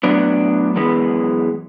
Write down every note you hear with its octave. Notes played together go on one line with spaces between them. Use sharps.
A2 F#3 B3 D4
F#2 E3 G#3 B3